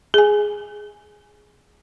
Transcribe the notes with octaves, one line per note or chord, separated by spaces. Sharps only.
G#4 G#5